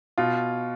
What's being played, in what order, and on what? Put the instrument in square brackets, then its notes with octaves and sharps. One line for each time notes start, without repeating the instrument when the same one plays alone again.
[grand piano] B2 F4